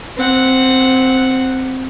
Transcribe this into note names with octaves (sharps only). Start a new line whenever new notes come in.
C4 F#5